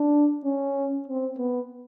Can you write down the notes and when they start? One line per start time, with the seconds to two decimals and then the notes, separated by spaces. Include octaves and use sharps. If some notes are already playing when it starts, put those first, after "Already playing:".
Already playing: D4
0.45 C#4
1.08 C4
1.38 B3